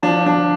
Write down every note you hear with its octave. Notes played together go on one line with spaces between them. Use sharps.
F3 D4
D4